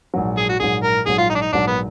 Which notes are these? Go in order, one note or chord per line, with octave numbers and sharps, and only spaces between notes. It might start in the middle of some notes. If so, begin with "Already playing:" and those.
A#1 G#2 F#3
G#4
F#4
A#1 G#2 F#3 G#4
A#4
A#1 G#2 F#3 G#4
F4
D#4
D4
D#4
A#1 G#2 F#3 D4
B3